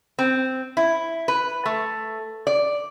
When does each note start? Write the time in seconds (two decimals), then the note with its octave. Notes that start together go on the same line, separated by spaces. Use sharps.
0.19 C4
0.77 E4
1.28 B4
1.66 A3
2.47 D5